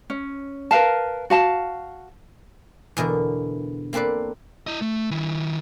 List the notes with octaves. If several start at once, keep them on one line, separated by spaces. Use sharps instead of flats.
C#4
A#4 B4 F5 A5
F#4 F5 A5
E2 B2 D3 A#4
A#3 C4 A4 B4 D5
E4 D#5
A3
D#3 E4